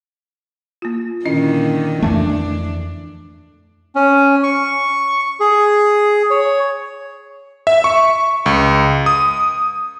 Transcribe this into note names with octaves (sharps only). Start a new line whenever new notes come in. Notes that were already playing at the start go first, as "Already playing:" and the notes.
A#3 F4
A#2 D3 D#3 C#4 E4 D#5
F2 E3 A3 D4
C#4
C#6
G#4
C#5
E5
C#6
C#2
D#6